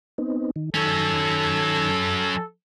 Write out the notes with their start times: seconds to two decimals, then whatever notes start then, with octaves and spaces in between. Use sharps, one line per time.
0.18 B3 C4 D#4
0.56 D#3
0.74 D#3 F#3 C#4 A4 G#6